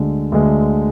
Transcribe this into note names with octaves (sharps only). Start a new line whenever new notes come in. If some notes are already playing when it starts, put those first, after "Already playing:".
Already playing: D2 D3 G#3
D2 D3 G#3